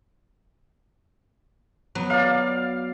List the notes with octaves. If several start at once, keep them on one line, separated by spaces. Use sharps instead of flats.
F#3 B3
D5 F5